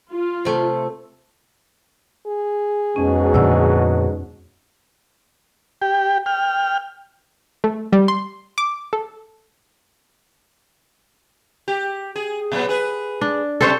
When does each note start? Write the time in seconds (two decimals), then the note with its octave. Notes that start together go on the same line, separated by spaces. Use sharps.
0.12 F4
0.45 C3 A3
2.27 G#4
2.96 F2 G#2 B2 F#3 C#4
3.34 F2 A#2 D3 D5 F#5 E6
5.82 G4 G5
6.26 G5 F6
7.64 A3
7.93 G3
8.08 C6
8.58 D6
8.93 A4
11.68 G4
12.16 G#4
12.52 A#2 F#3 B3
12.69 G#4 B4
13.21 D4
13.61 C3 G3 A3 A4 C5 C#5